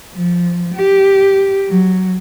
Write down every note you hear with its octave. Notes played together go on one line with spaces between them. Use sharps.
F3
G4
F#3